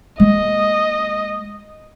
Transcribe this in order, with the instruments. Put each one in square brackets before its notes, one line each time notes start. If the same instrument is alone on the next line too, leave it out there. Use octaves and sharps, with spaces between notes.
[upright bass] G#3 A#3 [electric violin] D#5